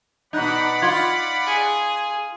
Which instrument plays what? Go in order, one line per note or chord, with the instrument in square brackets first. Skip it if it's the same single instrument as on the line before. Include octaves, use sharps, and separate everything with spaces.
[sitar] B2 D#4 [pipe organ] D5 F#5 B5 [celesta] D#5 F#6
[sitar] F4 [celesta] G#6
[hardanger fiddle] G#4